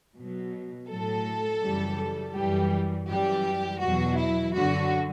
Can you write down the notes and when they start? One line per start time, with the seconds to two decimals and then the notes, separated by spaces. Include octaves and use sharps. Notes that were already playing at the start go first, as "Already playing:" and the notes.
0.15 B2 F#3
0.88 A2 F#3 A4
1.62 F#2 C#3 E3 G3
2.34 F#2 E3 G3 G4
3.08 F#2 E3 G3 G4
3.81 E2 B2 F#3 F#4
4.18 E4
4.54 F#2 D3 F#3 F#4